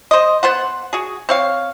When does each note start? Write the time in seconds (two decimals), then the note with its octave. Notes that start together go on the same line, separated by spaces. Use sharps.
0.11 C5 D#5
0.43 B3 C5 F#5
0.93 F#4 G#4
1.29 C4 C#5 F5